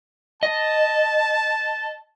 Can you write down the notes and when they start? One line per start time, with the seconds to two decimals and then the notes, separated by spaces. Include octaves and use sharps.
0.43 D#5 A5